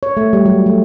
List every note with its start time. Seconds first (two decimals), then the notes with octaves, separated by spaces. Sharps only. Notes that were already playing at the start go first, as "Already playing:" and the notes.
0.03 C#5
0.17 A3
0.33 G3
0.46 F#3
0.66 A3